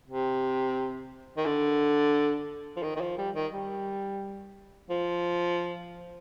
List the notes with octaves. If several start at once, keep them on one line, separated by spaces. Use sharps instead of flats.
C3
D#3
D3
F3
D#3
D#3
F3
G3
D#3
G3
F3